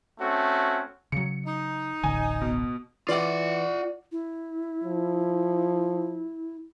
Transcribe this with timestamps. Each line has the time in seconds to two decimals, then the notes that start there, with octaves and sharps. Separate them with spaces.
0.20 A3 C4 C#4 F#4
1.12 C#3 F#3 C#7
1.46 D#4
2.04 D1 A1 D3 G#5
2.41 B2
3.09 E3 F4 D5 F#5
4.12 E4
4.84 F3